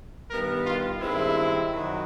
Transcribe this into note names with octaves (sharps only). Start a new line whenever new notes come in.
G2 D#3 G3 B3 A#4
F4
G2 D#3 G#3 C4 E4
F#2 D#3 F#3